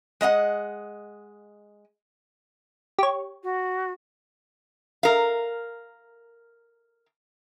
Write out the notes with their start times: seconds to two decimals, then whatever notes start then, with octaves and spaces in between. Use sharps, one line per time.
0.21 G#3 D#5 F5 F#5
2.99 G4 C#5
3.43 F#4
5.03 A#4 F5